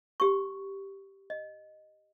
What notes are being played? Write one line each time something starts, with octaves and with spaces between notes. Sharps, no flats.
G4 C#6
D#5